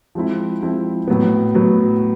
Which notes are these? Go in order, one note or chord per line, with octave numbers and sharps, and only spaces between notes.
F3 G#3 C4 E4
F3 G#3 C4 E4
A2 F#3 B3
A2 F#3 B3